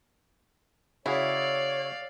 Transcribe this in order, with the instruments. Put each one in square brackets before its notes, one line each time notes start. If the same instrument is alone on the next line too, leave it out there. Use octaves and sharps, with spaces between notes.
[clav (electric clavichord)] C#3 F#4 G#4 [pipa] E4 [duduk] C#5 [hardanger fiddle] D5 F5